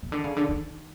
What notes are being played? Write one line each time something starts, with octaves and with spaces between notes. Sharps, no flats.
C#3
D3
C#3
D3
D#3